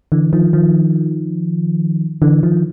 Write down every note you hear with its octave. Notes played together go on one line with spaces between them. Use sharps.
D3 E3
D#3 F3
D#3 F3
D3 E3
D#3 F3